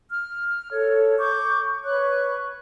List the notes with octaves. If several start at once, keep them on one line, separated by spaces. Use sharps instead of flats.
F6
A4 C#5
C#6 D6 G6
B4 C#5 C#6 F#6